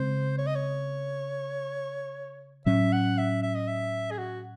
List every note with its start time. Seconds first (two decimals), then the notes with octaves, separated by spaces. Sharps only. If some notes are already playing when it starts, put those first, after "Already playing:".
Already playing: C#3 G#3 C4 C5
0.38 C#5
0.47 D#5
0.55 C#5
2.66 A2 F#3 C#4 E5
2.92 F#5
3.18 E5
3.43 E5
3.55 D#5
3.68 E5
4.11 G#4
4.18 F#4